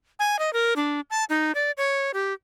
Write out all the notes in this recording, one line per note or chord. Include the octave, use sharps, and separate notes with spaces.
G#5
D#5
A#4
D4
A5
D#4
D5
C#5
G4